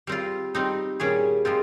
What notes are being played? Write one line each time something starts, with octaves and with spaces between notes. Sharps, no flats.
G3 C4 F4
G3 C4 D#4
A#2 G3 C#4 G#4
C3 F3 G#3 C4 F4